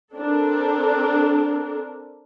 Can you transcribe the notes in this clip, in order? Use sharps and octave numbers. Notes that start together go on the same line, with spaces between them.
C4 D4 A4 A#4